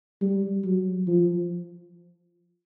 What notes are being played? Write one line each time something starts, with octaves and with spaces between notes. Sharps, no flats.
G3
F#3
F3